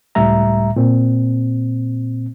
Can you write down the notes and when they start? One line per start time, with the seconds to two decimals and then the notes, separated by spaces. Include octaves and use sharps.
0.15 C#2 A2 G3 E5 A#5
0.76 A#2 C4